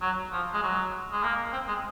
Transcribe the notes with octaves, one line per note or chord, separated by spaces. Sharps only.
F#3
F3
G#3
F#3
G#3
A#3
C4
G#3